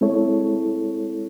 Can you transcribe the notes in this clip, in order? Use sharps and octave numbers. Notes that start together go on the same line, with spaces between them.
G#3 C4 E4 A4 C#5